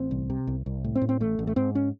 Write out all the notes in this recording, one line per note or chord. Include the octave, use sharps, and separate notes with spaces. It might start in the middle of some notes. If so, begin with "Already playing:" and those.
Already playing: A1 C4
C2
C3
C2
C2
A2
C4
A2
C4
A1 A3
A1
A3
G#2 C4
C#4